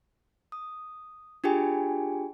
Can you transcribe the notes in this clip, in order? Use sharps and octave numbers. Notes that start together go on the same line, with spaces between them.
D#6
D4 F4 G4 G#4 G5 G#5